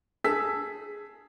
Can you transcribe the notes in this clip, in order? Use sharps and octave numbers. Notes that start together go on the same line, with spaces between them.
G#4 A5 E6 B6